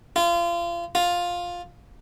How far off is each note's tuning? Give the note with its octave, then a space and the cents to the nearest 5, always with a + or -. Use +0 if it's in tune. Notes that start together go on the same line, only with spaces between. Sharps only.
F4 -30
F4 +10